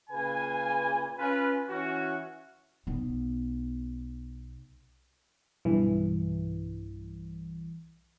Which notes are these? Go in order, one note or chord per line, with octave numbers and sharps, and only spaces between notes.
A#2 C#3 B4 G#5
C#4 F4 B4
E3 C#4 F#4
B1 B3
B1 G2 E3